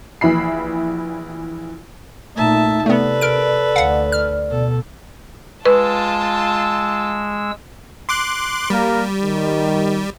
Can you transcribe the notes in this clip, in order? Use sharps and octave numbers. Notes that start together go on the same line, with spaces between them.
A#1 E3 E5 B5 C7
A#2 A3 D#4 E5 A5
C3 A3 B3 A4 B4 D5
A#4 D7
D2 F5 F#5
F6
B2 A4
G#3 F4 B4 A5 E6
C6 D6 F#6
G3 A#3 A#4
D#3